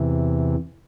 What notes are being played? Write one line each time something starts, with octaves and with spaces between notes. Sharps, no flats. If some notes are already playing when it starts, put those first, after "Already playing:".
Already playing: E2 C3 E3